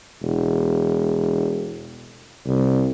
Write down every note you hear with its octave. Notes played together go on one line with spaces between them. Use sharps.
E1
C2